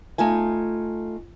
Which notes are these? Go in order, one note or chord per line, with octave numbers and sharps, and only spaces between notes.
A3 D#4 F4 G#5